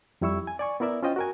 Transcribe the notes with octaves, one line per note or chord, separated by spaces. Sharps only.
F2 G3 E4 C#6 E6
G#5
D5 G#5 C#6
B3 E4 A#4 D5 E5
C#4 F4 C5 D#5 G5
F#4 A#4 G#5